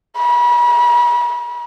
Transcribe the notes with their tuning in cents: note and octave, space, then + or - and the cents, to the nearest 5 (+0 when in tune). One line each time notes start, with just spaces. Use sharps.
B5 -40